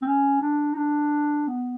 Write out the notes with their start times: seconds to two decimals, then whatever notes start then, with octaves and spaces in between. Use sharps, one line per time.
0.02 C4
0.07 C#4
0.42 D4
0.73 D#4
0.77 D4
1.48 B3